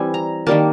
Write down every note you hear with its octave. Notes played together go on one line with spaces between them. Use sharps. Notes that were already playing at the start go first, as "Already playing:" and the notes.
Already playing: E3 G3 C4 G#5
A#5
D#3 G3 A#3 A5